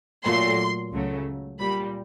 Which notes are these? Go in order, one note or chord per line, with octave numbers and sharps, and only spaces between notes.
A#2 F#3 A3 C6
C#2 C#3 F#3 A3
A#2 G3 B5